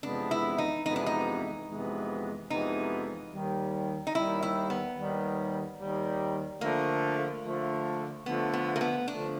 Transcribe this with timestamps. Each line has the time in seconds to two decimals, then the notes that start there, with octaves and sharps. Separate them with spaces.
0.03 F2 C3 E3 G#3 B3 D4
0.31 E4
0.58 D#4
0.85 F2 C3 E3 G#3 B3 D#4
0.96 D4
1.06 D#4
1.68 F2 C3 E3 G#3 B3
2.50 F2 C3 E3 G#3 B3 D#4
3.32 D#2 D#3 G3
4.07 D#4
4.15 D#2 D#3 G3 E4
4.43 E4
4.70 B3
4.97 D#2 D#3 G3
5.79 D#2 D#3 G3
6.61 D3 F3 A3 A#3
7.44 D3 F3 A3
8.26 D3 F3 A3 B3
8.53 B3
8.76 A#3
8.81 B3
9.08 D3 F3 A3 D4